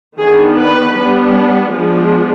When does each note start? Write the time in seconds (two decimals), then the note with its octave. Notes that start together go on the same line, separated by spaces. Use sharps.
0.18 D#3 B3 D4 G#4
0.57 B4
0.96 G3 B3 D4
1.73 F3 G#3 B3 D4